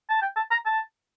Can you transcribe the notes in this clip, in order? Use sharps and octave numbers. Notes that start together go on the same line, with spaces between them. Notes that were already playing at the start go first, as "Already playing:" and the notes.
A5
G5
A5
A#5
A5